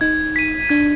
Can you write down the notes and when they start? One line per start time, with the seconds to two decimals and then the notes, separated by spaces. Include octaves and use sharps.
0.01 D#4 G#6
0.36 B6 D#7
0.70 D4 G#6